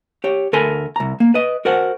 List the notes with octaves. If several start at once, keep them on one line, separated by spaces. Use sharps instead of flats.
G4 C#5
D2 A4 A#4 G#5 B5 C6
C2 A#5
A#3
B4 D#5
F#4 A#4 C5 F#5